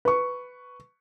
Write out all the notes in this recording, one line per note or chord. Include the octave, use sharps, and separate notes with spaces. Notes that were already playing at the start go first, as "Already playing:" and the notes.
B4 C#6